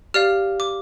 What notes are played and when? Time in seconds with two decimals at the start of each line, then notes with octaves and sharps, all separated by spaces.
0.14 G4 D5 F5 F6
0.60 D6